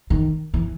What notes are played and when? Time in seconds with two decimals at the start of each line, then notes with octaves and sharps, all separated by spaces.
0.10 D#3
0.54 E3